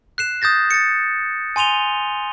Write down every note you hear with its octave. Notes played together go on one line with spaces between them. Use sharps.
F#6 C7 E7
D#6 G6 A6 A#6
A6 C#7
G#5 C6 D#7 F7 G7